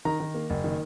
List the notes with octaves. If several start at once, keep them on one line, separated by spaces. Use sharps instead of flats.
D#3 A#5
D#3
A#3
F#1
D#3